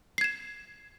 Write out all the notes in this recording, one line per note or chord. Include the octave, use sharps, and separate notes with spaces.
G#6 C7 E7